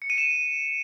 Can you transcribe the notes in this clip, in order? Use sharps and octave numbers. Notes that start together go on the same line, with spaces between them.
C#7
D#7
E7